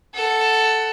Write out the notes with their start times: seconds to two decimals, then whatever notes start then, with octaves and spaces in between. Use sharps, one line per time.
0.15 A4 F#5